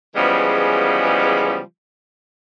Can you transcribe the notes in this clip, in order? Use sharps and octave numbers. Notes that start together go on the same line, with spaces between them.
C#3 E3 F3 G3 G#3 B3